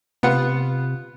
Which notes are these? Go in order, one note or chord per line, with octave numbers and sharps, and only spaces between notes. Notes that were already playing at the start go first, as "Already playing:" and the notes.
C3 B3 F4 F#5